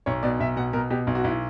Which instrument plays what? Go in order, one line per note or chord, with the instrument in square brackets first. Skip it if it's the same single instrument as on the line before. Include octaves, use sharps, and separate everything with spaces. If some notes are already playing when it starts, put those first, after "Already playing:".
[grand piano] B1 C#5
B2 D5
B1 E5
B2 F#5
B2 A#4
B2 G4
B1
F#4
B1 E4